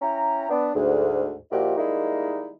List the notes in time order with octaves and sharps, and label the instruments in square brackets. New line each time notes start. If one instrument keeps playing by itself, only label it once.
[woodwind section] C#4 E4 G5 A#5
B3 D4
D2 G#2
A#2 F3 D#4 E4 F#4 G4
D#3 G3 G#3 A#3 D#4 E4